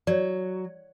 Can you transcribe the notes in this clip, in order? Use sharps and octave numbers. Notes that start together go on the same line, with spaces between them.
F#3 C#5 D5